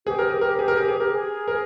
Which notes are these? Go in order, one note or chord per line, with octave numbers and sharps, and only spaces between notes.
G4 G#4
A#4
G#4
G4 A#4
G#4
A#4
G#4
G#4
A#4
G#4
A#4